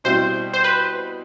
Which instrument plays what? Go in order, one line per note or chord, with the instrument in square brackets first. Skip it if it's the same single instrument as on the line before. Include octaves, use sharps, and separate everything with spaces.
[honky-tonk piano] B2 G3 C4 E4 [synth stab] C5
[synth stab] C5
B4